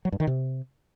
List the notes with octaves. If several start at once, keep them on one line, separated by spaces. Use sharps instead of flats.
F#3
G2
D#3
C3